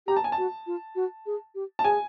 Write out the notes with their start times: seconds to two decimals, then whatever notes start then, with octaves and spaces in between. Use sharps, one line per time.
0.07 G4 A#5
0.17 A5
0.24 G#5
0.32 A5
0.38 F#4
0.67 F4
0.95 F#4
1.26 G#4
1.55 G4
1.79 A5
1.84 G#4 G#5